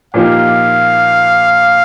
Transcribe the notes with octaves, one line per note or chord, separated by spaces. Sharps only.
A#2 F3 A#3 D#4 G4 F5